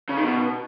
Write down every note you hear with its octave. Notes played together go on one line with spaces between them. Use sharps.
C#3
D#3
B2